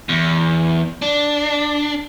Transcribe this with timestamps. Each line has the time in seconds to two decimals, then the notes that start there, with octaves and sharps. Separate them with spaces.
0.09 E2
1.02 D4